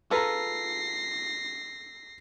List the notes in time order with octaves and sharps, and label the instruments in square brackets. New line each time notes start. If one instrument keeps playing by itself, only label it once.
[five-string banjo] F4 G#4 B4 [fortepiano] A4 A#5 [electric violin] A#6 C7